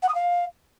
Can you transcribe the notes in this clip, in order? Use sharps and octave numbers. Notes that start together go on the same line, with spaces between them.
F#5
D#6
F5